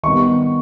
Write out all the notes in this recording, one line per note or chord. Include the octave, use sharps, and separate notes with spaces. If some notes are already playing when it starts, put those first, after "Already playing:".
D#3 G3 B3 C#6